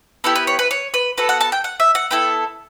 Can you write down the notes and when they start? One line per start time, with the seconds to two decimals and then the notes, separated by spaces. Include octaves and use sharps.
0.24 B3 E4 G4 A4
0.36 B4
0.47 C#5
0.59 B4
0.71 C#5
0.94 B4
1.18 B3 F#4 A4 B4
1.29 F#5
1.41 A5
1.52 G5
1.64 F#5
1.80 E5
1.95 F#5
2.11 B3 E4 A4 G5